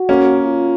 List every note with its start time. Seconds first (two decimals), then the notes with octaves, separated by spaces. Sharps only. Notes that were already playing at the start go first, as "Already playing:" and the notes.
Already playing: F#4
0.09 A#3 C#4
0.45 F4